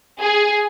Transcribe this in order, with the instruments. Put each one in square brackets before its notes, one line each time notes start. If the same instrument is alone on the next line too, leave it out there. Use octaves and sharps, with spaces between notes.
[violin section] G#4